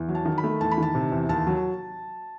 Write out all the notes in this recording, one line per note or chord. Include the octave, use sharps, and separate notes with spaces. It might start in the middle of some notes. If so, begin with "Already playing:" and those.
Already playing: E2
F#3
A5
D#3
B5
A3
E2 A5
B5
D#3 A5
C3
E2
D#2 A5
F#3